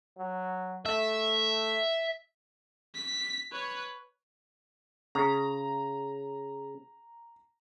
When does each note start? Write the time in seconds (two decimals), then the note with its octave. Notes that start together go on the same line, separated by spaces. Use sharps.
0.18 F#3
0.86 A3 E5
2.95 B6
3.52 B4 C#5
5.15 C#3 A#5